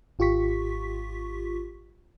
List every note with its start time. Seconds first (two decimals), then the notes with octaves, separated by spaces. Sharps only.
0.19 G#1 F4 G4 C#6 B6